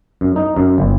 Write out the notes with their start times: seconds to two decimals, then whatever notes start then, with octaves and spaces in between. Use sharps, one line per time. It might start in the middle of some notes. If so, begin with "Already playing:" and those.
0.21 F#2
0.36 D#4
0.57 F#2
0.78 G1